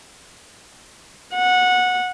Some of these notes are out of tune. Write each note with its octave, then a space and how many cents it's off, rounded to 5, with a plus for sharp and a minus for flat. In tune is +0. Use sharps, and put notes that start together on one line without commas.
F#5 -15